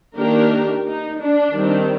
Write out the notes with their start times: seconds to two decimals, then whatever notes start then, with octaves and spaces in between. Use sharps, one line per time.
0.17 D#3 A#3 D4 G4 A#4
0.85 D#4
1.19 D4
1.53 D#3 G3 C4